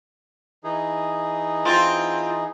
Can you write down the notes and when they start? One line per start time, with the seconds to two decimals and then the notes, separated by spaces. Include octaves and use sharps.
0.64 E3 D#4 G#4
1.65 C4 F4